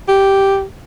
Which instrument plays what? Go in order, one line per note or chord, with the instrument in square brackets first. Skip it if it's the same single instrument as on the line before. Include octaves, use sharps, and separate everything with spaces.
[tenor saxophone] G4